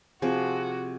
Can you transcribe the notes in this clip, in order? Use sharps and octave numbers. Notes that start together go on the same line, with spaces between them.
C3 F3 C4 F#4 G#4